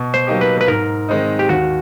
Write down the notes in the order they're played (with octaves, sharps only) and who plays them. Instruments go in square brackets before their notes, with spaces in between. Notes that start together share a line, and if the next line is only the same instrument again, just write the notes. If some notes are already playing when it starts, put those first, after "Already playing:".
Already playing: [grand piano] B2
[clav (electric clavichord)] C5
[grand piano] F#3 A#3 D#4 G4
[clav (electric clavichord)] B4
B4
[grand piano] G#2 [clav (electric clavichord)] A#4
[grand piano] D#3 G#3 C4 D#4
[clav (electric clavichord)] G4
[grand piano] D#2 [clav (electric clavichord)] F#4